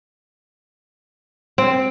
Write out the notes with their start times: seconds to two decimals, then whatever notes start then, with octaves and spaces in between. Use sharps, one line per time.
1.58 C4